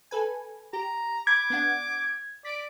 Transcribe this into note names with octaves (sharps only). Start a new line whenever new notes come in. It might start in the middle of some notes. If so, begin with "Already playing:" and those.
A4 B4 G#5
G4 A#5
B5 D6 G#6
B3 D4 F#5
D5 B6 D7